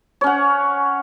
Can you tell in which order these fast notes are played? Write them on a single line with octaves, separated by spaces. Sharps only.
C#5 C#4 F#5